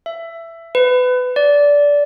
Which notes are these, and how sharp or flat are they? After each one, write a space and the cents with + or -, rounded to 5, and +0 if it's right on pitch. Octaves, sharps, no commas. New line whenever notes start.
E5 +15
B4 +25
D5 -15